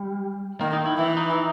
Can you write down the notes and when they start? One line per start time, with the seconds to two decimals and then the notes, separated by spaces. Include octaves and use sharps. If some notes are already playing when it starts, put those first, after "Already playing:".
Already playing: G3
0.61 D#3 A#3
0.73 D#4
0.86 E4
0.98 E3 E4
1.17 D#4